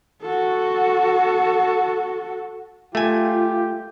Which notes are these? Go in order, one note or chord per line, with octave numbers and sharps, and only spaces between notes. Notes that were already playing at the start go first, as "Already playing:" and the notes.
F#4 A4
A3 F4 G4 G#5